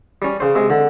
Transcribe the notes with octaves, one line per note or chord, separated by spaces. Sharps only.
G3 C#4
C#3 C5
C3 G#3
D3